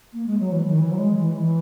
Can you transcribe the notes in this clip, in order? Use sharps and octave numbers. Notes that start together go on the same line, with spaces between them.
A#3
G#3
F#3
E3
D#3
E3
F#3
G#3
E3
E3